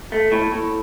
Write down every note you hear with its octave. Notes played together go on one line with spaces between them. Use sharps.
A3
A2
A2